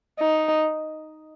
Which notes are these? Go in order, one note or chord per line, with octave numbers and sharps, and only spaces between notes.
D#4